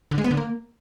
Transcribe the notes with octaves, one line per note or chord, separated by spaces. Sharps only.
D3
G#3
B3
D3
A#3